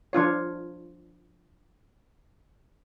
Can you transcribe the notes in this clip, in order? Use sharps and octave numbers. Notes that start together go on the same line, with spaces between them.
F3 D4 F4 C#5